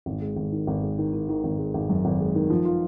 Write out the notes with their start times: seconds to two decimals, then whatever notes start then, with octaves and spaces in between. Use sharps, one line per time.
0.06 G#1
0.22 G#3
0.36 G#1
0.52 D#3
0.67 G#1
0.83 G#3
0.98 D#3
1.14 D#3
1.29 D#3
1.44 G#1
1.58 G#3
1.74 G#1
1.90 F#2
2.05 G#1
2.20 G#3
2.35 D#3
2.50 F3
2.65 F4